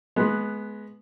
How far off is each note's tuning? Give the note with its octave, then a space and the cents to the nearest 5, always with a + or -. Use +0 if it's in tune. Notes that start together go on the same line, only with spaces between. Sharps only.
G#3 +25 B3 +0